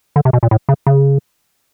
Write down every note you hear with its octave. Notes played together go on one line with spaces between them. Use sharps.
D3
C3
B2
A#2
A2
C#3
C#3